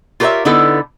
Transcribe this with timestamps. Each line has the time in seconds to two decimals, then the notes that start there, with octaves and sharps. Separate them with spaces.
0.20 F4 G4 A#4 B4 C#5 E5
0.45 D3 B3 D#4 E4 A4